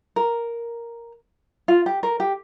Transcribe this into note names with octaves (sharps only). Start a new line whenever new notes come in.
A#4
F4
G4
A#4
G4